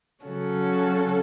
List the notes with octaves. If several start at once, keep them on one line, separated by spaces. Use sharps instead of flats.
C#3 F#3 C#4 F#4 A4